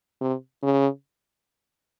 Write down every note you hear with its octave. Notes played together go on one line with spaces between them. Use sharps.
C3
C#3